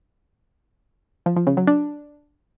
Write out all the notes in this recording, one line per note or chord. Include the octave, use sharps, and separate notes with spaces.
F3
F3
C#3
F#3
D4